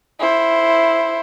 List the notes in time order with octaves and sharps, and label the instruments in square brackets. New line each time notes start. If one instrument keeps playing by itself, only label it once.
[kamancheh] E4 C5